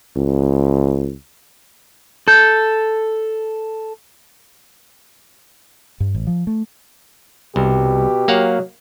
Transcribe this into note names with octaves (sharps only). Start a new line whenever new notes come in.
C#2
A4 G6 A6
G2
A1
F3
A3
C2 B2 G4
F#3 A#3 F5 F#5